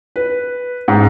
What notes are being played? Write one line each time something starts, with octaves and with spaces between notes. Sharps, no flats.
B4
G#2